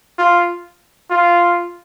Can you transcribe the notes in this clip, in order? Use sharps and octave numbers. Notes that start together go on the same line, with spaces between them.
F4
F4